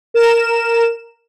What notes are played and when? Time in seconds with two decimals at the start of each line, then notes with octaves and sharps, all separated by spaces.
0.14 A#4 E7